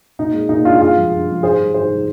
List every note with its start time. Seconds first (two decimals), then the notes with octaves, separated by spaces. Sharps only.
0.19 A#2 D#4
0.34 G#3
0.49 A#2 D#4
0.65 G#3 D4 F4
0.80 G2 F4 G#4
0.97 F3 G#3
1.11 G2
1.28 F3 G#3
1.43 G#2 G#4 C5
1.58 D#3 G3
1.74 G#2 G#4 C5
1.89 D#3 G3